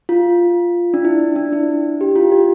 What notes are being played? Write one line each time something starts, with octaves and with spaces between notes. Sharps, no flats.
F4
D4
E4
D4
E4
G4
F4
G4